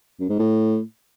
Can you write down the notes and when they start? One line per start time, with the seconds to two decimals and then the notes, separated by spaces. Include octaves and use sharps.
0.20 F#2
0.29 G#2
0.39 A2